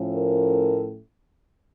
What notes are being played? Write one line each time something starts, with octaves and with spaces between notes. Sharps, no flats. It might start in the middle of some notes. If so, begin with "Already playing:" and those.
Already playing: A2 F3 A3 C#4
A#4